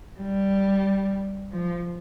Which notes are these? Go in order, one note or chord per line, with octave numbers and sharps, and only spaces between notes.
G3
F3